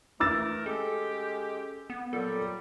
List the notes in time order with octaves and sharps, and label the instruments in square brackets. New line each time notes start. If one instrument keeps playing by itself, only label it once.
[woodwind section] E3 A3 A#4 [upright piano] D6 E6 A6
[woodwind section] G#3 C#4 G4 [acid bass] A4
[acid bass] B3
[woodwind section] A#2 F#3 G3 [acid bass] A4